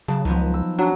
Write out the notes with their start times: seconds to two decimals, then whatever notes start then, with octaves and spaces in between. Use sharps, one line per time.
0.08 C#3 F#3 A5
0.25 C#2 F3 B3 D#4
0.54 E6
0.79 F#3 D4 F#4